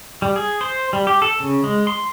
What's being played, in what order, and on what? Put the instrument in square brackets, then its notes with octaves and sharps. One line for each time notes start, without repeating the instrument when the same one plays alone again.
[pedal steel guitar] G3
G#4
C5
G3
G4
A4
C#3
G#3
C6